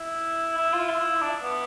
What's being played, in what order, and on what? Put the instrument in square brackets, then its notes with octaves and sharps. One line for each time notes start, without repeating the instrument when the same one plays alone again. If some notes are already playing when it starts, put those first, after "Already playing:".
Already playing: [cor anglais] E4
E4
F4
E4
D4
B3